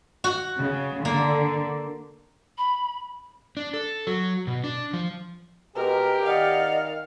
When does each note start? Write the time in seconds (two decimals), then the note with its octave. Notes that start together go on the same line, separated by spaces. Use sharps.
0.24 F#4
0.58 C#3
1.05 D3 A#3
2.58 B5
3.57 D4
3.74 A4
4.07 F#3
4.47 B2
4.64 D4
4.93 F3
5.76 B2 G#3 G4 A#4
6.26 D#3 D5 D#5 F5 F#5